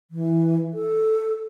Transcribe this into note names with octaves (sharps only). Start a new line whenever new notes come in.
E3
A4